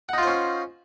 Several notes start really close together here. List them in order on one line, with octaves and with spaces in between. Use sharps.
F#5 D#4 F4 C5 C#4